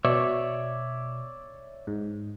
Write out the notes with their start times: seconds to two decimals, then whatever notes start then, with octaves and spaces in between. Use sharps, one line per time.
0.05 B2 C#5 D5 E5
1.87 G#2